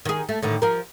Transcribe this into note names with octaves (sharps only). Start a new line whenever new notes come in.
D#3 G#4
A3
A2 D3 D#3
F3 A#4